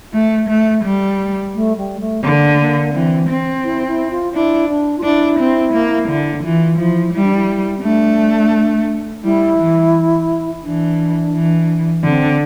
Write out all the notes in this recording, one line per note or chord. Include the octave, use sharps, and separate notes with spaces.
A3
A3
G3
A3
G3
A3
D3 A#3
A3
A#3
E3 C4
C4
E4
E4
F4
D4 E4
D4
F4
D4 E4
C4
A#3
D3
E3 F4
F3 E4
G3 E4
D4
E4
C4
A3 D4
G3 E4
E3
E3 D4
E3
D3 C4